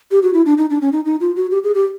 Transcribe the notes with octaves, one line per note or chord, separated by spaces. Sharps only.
G4
F#4
E4
D4
D#4
D4
C#4
D#4
D#4
F4
F#4
G4
G#4
G4